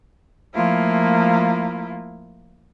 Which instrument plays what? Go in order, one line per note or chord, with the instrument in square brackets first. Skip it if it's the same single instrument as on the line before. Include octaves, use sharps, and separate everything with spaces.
[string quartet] F3 A3 A#3 E4 F4